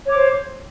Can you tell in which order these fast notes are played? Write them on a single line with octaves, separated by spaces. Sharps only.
C#5 D6 C5